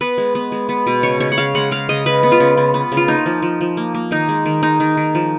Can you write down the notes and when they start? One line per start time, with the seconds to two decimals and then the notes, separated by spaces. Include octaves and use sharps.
0.01 B3 B4
0.18 G#3
0.35 B3
0.52 G#3
0.69 B3
0.87 B2
1.03 C#3 C#5
1.20 C#3 C#5
1.32 F#5
1.38 C#3 F5
1.55 G#3 F#5
1.71 C#3 F5
1.89 C#3 D#5
2.06 C#3 B4
2.23 B3
2.32 F4
2.40 C#3
2.58 C#3
2.74 B3
2.92 C#3
2.97 F4
3.08 A#3 D#4
3.26 F3
3.42 F3
3.61 F3
3.77 A#3
3.94 A#3
4.11 D#3 D#4
4.29 G#3
4.46 D#3
4.63 G#3 D#4
4.80 D#3
4.97 D#3
5.15 F3